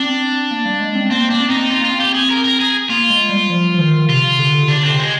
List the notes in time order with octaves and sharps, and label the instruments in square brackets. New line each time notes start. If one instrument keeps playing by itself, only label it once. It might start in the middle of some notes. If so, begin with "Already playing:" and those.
Already playing: [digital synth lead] C4 [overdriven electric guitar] D4
[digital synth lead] A#3
G3
G#3
C4
[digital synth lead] A#3 [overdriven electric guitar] C4
[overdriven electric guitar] D4
[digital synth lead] C4
[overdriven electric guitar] D#4
[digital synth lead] C4 [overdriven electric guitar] F4
[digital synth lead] A#3 [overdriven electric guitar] F4
[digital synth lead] C4
[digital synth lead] C4 [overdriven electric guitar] G4
[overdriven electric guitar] G#4
A#4
A#4
G#4
[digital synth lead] A#3 [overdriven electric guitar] F4
[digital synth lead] G#3
G3
F3
F3
D#3
[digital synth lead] C3 [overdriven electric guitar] F4
[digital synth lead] D3
C3
[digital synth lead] D3 [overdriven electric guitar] D4
[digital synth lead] C3 [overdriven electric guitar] C4
[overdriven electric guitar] G#3